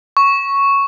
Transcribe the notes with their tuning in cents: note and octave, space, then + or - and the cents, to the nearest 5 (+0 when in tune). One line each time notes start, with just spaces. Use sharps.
C#6 +0